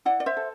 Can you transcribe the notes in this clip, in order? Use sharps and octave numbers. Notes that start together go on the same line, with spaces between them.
E4 D5 F#5
D5
C5 E5
A4